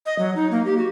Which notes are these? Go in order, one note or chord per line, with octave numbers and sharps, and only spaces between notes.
D#5
F#3
D#4
A#3
G4
F#4